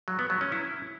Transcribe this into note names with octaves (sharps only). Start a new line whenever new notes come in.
F#3
B3
F#3
C#4
E4